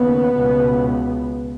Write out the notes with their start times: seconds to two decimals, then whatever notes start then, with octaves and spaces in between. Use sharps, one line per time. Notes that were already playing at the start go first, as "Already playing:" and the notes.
Already playing: D#2 C#3 B3
0.36 C#2 B2